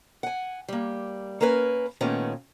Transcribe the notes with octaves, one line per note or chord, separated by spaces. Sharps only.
F#5 G#5
G3 A#3
A#3 C#4 A#4 B4 G#5
A#2 D#3 A3 B3 C#4